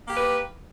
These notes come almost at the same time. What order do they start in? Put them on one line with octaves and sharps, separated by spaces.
A#3 G4 B4